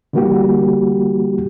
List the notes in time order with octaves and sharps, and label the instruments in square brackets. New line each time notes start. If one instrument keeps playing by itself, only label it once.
[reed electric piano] D3 E3 G3 A#3 F#4 G4